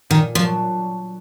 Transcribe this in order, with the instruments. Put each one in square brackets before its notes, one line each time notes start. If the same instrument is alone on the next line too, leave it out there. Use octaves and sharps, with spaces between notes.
[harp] A#2 [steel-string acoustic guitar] D#3
[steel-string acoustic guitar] F3 [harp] F#3 D4